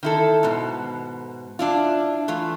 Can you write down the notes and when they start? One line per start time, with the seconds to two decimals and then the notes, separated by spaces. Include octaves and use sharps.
0.03 D#3 E4 A4
0.43 G#2 B2
1.59 D4 E4 F4
2.28 E3 A3 F4